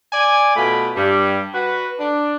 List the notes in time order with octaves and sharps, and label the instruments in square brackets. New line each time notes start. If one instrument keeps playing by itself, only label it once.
[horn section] D5 G#5
B2 A3 F4 B5
G2 G3
F#4 B4
D4